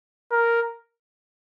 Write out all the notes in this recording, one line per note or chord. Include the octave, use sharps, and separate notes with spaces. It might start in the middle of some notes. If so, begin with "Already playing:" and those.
A#4